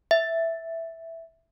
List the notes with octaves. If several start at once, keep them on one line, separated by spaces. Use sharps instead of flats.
E5